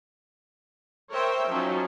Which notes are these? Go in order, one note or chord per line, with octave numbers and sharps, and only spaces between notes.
A#4 C5 C#5 E5 G5
F3 F#3 C#4 D#4